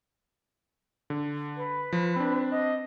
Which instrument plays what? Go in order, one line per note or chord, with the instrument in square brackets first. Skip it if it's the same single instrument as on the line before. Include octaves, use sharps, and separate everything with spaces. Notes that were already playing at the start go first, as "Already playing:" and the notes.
[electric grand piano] D3
[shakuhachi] B4
[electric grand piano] F3
C4 D4
[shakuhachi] D#5